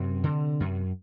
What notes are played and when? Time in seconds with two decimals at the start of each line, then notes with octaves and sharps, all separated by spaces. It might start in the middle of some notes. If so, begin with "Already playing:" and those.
Already playing: F#2 C3 C4
0.24 D3
0.60 F#2